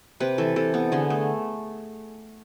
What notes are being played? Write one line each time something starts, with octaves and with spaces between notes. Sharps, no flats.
C3 B4
E3 A4
C3 A4
B3
D3 G#4
A3